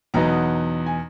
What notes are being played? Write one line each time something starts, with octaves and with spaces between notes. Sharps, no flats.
E2 B2 F#3 B3 D#4 A#5
G#5